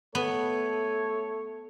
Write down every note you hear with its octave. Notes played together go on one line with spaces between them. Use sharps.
A3 B3 A4 C#5